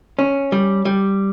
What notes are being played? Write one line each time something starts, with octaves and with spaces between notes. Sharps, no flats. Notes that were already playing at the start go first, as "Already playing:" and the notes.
C#4
G3
G3